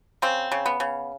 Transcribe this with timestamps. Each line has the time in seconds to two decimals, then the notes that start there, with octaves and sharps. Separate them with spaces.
0.22 C#3 C4
0.52 C#3
0.66 B3
0.80 C#3